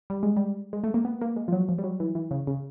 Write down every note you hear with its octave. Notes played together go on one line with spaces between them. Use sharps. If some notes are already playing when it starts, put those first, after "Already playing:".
G3
G#3
G3
G#3
A3
A#3
B3
A#3
G#3
F3
F#3
F3
G3
F#3
E3
E3
C#3
C#3